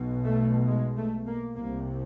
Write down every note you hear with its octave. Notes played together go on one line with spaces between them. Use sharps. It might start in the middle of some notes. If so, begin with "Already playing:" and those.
Already playing: B1 B2
A3
G#3
A3
A#3
C2 C3 A#3